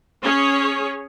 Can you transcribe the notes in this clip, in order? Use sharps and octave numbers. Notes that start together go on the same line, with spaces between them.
C#4 G#4 C#5